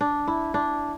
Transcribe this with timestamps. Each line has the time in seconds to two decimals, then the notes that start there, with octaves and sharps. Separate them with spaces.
0.01 D4
0.27 E4
0.54 D4